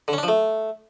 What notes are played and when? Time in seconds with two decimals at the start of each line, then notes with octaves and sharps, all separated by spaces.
0.08 D3
0.13 C#4
0.18 D4
0.23 F3
0.28 A3